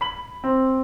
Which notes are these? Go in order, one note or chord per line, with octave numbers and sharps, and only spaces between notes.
B5 F#7
C4